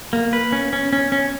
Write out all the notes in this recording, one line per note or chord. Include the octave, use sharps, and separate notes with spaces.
A#3
B4
C#4
C#4
C#4
C#4